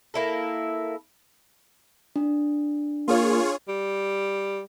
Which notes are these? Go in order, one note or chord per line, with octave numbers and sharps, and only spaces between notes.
A#3 E4 A4
D4
A#3 F4 G#4 C#5
G3